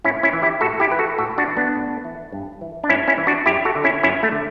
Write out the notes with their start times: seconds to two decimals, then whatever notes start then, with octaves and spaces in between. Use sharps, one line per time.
0.04 A2 C#4 E4
0.23 C#4 E4
0.33 E3
0.42 E4 G4
0.61 A2 F#4 A4
0.80 E4 G4
0.90 E3 B4
0.99 F#4 A4
1.18 A2 F#4 A4
1.38 D4 F#4
1.47 E3
1.57 B3 D4
1.75 A2
2.04 E3
2.32 G2
2.61 E3
2.84 D4
2.89 G2 C#4 E4
3.08 C#4 E4
3.18 E3
3.27 D4 F#4
3.46 F#2 E4 G4
3.65 F#4 A4
3.75 D3
3.84 C#4 E4
4.03 F#2 C#4 E4
4.23 A3
4.32 D3